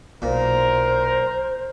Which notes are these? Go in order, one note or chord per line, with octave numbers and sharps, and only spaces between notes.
B1 A#2 A#4 C5